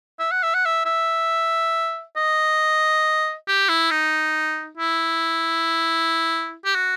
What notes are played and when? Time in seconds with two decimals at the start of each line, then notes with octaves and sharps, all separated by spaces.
0.19 E5
0.31 F#5
0.43 E5
0.54 F#5
0.66 E5
0.85 E5
2.16 D#5
3.48 G4
3.69 E4
3.91 D#4
4.78 E4
6.65 G4
6.75 F#4